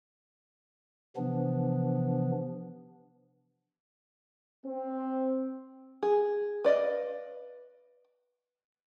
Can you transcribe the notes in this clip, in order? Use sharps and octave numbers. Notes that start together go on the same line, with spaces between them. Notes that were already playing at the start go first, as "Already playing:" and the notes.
C3 E3 F3 B3 D4
C4
G#4
B4 D5 D#5 F5